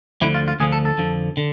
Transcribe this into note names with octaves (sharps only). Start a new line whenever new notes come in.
D2 D3 F3 E4
F4
F4
D2 D3 F3 G#4
A4
A4
F2 D3 F3
D3